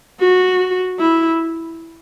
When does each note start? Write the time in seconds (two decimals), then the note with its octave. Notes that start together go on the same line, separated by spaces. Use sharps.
0.20 F#4
0.99 E4